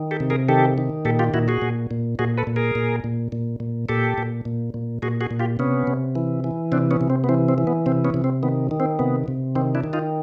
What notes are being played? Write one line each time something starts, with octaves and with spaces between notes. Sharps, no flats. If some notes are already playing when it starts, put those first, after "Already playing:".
Already playing: D#3
G4 A4
C3
G#4 A#4
D#3 G4 A4
D#3
A#2 G4 A4
F4 G4
A#2 E4 F#4
F#4 G#4
A#2
A#2
A#2 F#4 G#4
A4 B4
A#2
G#4 A#4
A#2
A#2
A#2
A#2
A#2 G4 A4
A#2
A#2
A#2
A#2 F#4 G#4
F#4 G#4
A#2
F4 G4
C3 B3 C#4
C3
E3
E3
C3 C4 D4
B3 C#4
C3
C4
B3
E3 C4
C4
E3
B3
C3 C4
B3 C#4
C3
C4
D#3 B3
D#3
C4
C3 B3
C3
D#3 C4
D4 E4
D#3
D#4 F4